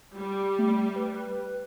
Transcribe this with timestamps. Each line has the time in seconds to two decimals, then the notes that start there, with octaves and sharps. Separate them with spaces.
0.17 G3
0.59 A3
0.96 B4